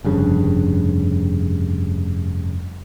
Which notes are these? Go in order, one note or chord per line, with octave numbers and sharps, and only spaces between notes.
F1 G2 C#3